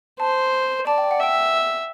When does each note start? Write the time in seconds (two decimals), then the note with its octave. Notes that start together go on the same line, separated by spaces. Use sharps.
0.20 C5 A5
0.86 D5 A5
0.98 G5
1.11 F#5
1.20 E5 G5